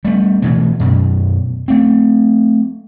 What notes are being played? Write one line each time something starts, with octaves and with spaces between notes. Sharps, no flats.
G3 A3 B3
B2 E3 A3
F#2 B2
A3 C4